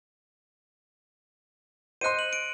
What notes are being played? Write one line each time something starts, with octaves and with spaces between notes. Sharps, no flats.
C5 D#5 C6 F#6 C#7 D#7
F#7
D7